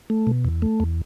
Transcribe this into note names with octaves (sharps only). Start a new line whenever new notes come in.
A3
B2
E2
A3
E2